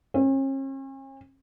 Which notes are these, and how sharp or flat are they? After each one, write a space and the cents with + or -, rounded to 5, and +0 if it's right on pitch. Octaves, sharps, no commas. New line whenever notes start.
C#4 -45